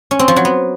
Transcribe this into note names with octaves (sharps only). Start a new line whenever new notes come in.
C#4
C4
F3
F#3
B3